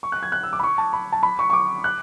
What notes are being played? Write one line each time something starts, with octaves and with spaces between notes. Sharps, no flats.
C#6
F#6
G#6
F#6
E6
D6
B5
C#6
A5
B5
A5
B5
C#6
C#6
D6
F#6